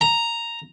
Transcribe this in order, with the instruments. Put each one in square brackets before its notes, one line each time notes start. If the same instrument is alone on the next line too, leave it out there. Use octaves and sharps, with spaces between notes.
[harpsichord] A#5